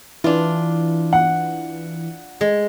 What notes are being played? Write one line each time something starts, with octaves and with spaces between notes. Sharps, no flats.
E3 D4 F4
F#5
G#3